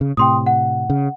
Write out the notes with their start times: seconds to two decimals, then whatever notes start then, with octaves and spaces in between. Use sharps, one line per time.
0.01 C#3
0.17 A2 C3 G5 C6 D#6
0.46 F#5
0.90 C#3